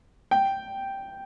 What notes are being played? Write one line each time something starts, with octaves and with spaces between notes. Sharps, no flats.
G5